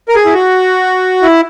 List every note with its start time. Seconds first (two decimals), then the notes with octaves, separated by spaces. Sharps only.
0.09 A#4
0.15 G#4
0.25 E4
0.33 F#4
1.22 E4